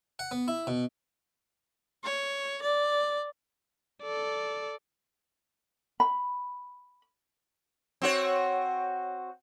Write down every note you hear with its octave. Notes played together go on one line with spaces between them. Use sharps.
F#5
B3
E4
B2
C#5
D5
A4 D5
B5
C4 F#4 C#5